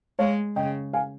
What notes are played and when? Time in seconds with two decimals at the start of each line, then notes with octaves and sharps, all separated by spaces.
0.19 G#3 C#5 F5
0.56 C#3 D#5 G5
0.93 F5 G#5